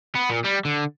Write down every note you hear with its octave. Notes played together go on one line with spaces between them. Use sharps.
B3
A#2
G3
D3